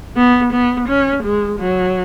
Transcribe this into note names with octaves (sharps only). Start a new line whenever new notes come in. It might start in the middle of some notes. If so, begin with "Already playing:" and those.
B3
B3
C#4
G#3
F#3